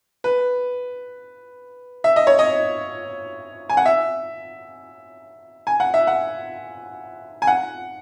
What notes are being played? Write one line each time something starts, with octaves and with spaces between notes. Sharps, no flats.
B4
E5
D#5
C#5
D#5
G#5
F#5
E5
G#5
F#5
E5
F#5
G#5
F#5